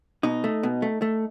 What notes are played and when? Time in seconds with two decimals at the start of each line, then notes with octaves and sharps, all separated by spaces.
0.23 B2 D#4
0.44 A3
0.63 B2
0.82 A3
1.02 A3